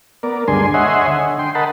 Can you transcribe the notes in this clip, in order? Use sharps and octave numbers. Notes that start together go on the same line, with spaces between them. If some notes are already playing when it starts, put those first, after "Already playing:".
B3 A#4 D5
D2 G2 G#3 D4 G#5 C6
C#5 D#5 E5 F#5 G#5 C6
D3
G5 C6
A#4 D#5 F#5 A5 B5